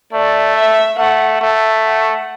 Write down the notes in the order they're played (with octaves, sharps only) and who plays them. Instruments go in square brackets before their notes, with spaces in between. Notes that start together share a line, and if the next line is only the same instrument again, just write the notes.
[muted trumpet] A3 [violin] D5
[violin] E5
[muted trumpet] A3 [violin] F#5
[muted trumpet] A3
[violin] F#5